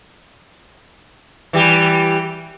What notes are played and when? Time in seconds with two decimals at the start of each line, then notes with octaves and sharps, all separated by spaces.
1.53 E3 G3 G4